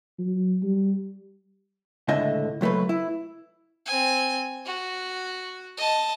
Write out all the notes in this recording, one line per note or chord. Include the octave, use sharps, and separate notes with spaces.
F#3
G3
C#2 A2 D3 A3 D#5 E5
C#2 F#3 A3 A#3 B4
E4
C4 G#5
F#4
D#5 A5